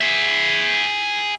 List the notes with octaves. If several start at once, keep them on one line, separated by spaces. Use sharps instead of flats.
G#4 E5